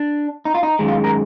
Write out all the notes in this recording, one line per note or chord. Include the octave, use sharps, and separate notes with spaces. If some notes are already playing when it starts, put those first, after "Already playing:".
Already playing: D4
D#4
F4
D#4
F#2 D#3 G#3
F4
A#4